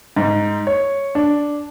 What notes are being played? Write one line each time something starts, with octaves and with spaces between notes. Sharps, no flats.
G#2
C#5
D4